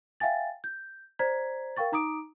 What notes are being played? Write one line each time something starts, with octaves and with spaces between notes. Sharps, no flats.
E5 F5 G5 G#5 A6
G6
C5 D5 A#5 G#6 B6
A#4 F5 G5 C#6 A6
D#4 A#5 D6 D#6 D7